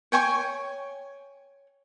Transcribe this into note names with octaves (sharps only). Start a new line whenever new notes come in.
C#5 G5 G#5 C#6